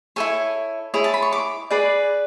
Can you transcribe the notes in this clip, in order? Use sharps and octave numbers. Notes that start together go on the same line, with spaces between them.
E4 A4 C#5 G#5
E4 G#4 C#5
A5
B5
C#6
D6
G#4 B4 D5 D6